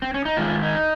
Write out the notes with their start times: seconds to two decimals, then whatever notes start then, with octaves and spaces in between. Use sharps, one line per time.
0.02 C4
0.14 C#4
0.25 D#4
0.37 G#2 D#3 G#3 F4
0.63 D#4